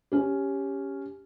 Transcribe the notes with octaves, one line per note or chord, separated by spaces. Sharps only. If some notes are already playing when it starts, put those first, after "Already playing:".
C#4 G4